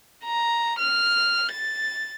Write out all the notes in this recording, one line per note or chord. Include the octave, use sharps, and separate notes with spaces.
A#5
F6
A6